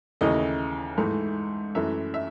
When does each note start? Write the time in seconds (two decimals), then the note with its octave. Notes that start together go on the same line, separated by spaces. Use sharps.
0.21 D#2 C#3 E3 A3 D#5
0.98 G#2 E3 A3
1.75 F#2 E3 A3 E5
2.14 E5